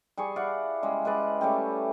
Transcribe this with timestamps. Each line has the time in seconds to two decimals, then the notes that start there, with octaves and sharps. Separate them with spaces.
0.17 G3 G#4 C#6
0.36 E4 D5 F5 F#5
0.83 C#3 G3 G#3
1.05 G#3 B4 D5
1.41 G3 A3 C#4 G4